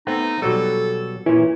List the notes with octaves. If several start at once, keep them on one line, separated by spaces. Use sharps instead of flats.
A3 B3 C4 D#4
B2 F#3 G3 A4
A#2 E3 C#4